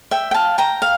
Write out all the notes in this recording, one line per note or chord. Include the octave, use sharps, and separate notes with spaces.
E5 G5
G5
F5 A5
G5 A#5
F5